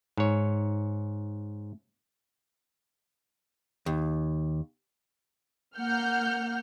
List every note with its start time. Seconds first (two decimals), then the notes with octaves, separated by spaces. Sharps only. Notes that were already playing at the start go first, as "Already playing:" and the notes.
0.17 G#2 C#5
3.86 D#2
5.78 A#3 F#5 F6 G6